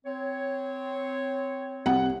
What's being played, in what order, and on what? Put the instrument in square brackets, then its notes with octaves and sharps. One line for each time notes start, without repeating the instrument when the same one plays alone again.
[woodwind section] C4 C#5
[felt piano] C2 F#5